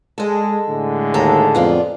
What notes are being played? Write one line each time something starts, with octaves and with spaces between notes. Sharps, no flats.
G#3 A4 D#5
A2 D3 G#3
D#2 A4 A#5
F2 B3 F4 D5